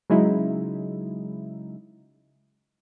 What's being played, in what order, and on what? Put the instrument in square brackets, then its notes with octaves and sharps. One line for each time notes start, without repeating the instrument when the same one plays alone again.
[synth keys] C#3 F#3 G#3 D#4 E4